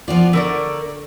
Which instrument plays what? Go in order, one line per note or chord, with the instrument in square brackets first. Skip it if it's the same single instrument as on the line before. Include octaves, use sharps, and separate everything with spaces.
[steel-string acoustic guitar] F3 B3 F4 [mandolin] D5
[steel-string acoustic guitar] D3 [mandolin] A3 A#4 D5